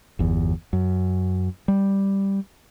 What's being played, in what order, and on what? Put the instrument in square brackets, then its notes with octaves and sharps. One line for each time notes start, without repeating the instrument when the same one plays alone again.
[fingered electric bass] G1 E2
F#2
G3